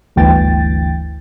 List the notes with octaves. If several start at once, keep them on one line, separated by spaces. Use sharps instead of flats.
G1 D2 E3 G5 A6